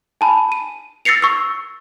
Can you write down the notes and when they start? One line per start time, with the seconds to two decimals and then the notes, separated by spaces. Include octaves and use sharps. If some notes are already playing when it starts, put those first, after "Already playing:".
0.21 G#5 A5 B5
0.52 D#7
1.05 E6 A6 A#6 C7 C#7 F7
1.22 C#6 E6